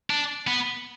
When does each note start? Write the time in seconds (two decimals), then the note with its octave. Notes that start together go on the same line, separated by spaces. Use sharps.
0.10 D4
0.47 B3